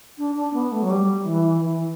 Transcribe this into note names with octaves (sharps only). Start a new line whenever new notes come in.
D4
D4
B3
A3
F#3
G3
E3
E3